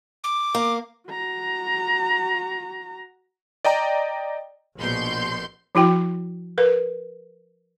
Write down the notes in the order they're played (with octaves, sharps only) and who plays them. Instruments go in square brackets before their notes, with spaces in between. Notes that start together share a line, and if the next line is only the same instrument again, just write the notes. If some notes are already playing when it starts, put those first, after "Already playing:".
[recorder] D6
[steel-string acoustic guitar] A#3
[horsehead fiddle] F#4 A#5
[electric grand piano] D5 D#5 G5 A#5
[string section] A#1 B2 C6 G6
[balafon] F3 E4 F#4 G5
A#4 B4